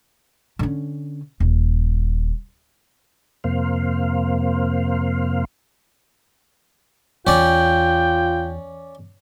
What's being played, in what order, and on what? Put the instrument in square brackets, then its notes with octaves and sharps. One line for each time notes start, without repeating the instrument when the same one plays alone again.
[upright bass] D3 C#4
D#1
[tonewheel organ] F2 C3 A#3 C5 F5
[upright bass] E2 [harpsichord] C#4 D5 [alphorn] F4 [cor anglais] G5